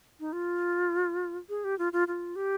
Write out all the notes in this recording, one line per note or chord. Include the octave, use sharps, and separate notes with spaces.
D#4
F4
G#4
G4
F4
F4
F4
G4